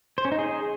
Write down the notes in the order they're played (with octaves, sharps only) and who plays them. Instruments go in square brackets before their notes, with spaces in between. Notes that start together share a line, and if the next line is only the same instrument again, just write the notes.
[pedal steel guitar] C5
C#4
D#4
G#4